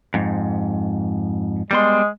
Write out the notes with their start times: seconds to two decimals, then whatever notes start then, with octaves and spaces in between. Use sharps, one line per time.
0.14 F2 G#2
1.71 G3 G#3 B3 C6